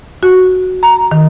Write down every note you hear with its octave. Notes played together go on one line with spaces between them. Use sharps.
F#4
A#5
D#3